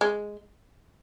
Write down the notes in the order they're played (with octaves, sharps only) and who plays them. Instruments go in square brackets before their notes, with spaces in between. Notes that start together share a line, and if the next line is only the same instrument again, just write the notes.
[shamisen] G#3